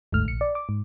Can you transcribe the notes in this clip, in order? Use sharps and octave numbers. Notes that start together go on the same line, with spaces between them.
G1 D2 G#2 A3 F6
A#1 C#7
D5
D6
G#2